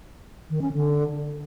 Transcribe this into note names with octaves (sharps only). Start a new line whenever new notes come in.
D#3
C#4
D3